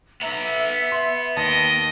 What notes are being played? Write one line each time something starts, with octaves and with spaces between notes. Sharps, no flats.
B3 E5 A#5
C6
D#2 D#5 G5 A5 A6